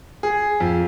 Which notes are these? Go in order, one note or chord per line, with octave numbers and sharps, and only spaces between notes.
G#4
F2